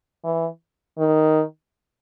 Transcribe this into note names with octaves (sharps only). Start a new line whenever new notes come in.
E3
D#3